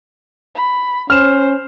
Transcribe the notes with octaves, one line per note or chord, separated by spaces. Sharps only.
B5
C#4 C5 F6 E7